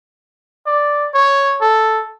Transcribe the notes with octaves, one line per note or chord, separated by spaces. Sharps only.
D5
C#5
A4